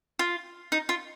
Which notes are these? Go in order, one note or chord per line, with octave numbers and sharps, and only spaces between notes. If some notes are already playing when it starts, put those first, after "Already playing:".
F4
D#4
F4